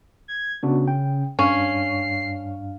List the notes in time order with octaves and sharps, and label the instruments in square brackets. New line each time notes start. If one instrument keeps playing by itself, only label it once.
[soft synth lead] G#6
[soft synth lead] C#3 [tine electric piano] B3 D4 F#4
[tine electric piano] G5
[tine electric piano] G2 D4 F5 [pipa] C#4 [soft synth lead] C7